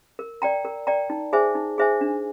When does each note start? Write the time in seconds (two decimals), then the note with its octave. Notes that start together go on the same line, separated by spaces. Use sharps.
0.19 A#4
0.42 D5 G5 A#5
0.65 A#4
0.87 D5 G5 A#5
1.10 D#4
1.33 G#4 C5 E5 G#5
1.55 D#4
1.78 G#4 C5 E5 G#5
2.01 D4